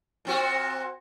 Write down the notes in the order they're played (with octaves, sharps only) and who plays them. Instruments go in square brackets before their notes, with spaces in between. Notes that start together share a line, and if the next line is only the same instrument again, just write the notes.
[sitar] A#2 C4 F#4